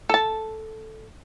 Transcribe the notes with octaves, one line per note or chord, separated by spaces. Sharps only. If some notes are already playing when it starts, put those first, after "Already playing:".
A4 A5